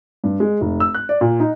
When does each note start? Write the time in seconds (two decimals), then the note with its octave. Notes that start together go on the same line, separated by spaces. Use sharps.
0.24 G2
0.40 G#3
0.61 F1
0.80 E6
0.94 F#6
1.09 D5
1.21 A#2
1.40 D#4